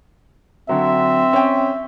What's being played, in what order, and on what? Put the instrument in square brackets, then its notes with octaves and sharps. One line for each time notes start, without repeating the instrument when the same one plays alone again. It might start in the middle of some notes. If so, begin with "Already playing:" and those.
[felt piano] D3 F#3 [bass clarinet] C4 [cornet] E5
[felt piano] C#4 G5